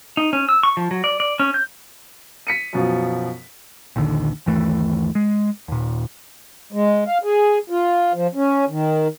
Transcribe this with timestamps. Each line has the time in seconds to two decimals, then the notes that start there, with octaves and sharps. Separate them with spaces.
0.17 D#4
0.33 C#4
0.49 E6
0.63 C#6
0.77 F3
0.91 F#3
1.04 D5
1.20 D5
1.40 C#4
1.54 G6
2.47 B6 C#7 D#7
2.73 F#2 B2 F3
3.96 A#1 D#2 D3 D#3
4.46 G1 D#2 E3 A3
5.15 G#3
5.68 D#2 A#2
6.72 G#3
7.07 F5
7.24 G#4
7.70 F4
8.14 F3
8.35 C#4
8.69 D#3